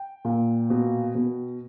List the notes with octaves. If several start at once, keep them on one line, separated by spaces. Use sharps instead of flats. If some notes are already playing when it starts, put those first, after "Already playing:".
Already playing: G5
A#2
B2
B2